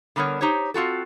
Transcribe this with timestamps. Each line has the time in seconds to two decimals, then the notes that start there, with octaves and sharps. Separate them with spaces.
0.16 D3 G3 B3 A#4 C#5
0.41 D#4 G4 C5 C#5
0.74 C4 F4 F#4 A4